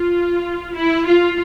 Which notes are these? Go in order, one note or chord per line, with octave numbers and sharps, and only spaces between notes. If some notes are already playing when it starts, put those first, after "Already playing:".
Already playing: F4
E4
F4